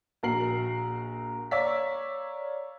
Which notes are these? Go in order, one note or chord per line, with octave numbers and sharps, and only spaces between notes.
A#1 F#4 A#4 A#5 C7 F#7
C#5 D5 F5 A#5 E6 B6